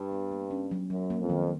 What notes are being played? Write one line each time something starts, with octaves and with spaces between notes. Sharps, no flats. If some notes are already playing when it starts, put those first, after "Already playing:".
Already playing: G2
B3
A#3
C#4
F#3
F#2 F#3
A#3
F2
D#3